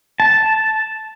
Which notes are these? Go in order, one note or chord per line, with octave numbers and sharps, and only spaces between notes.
A5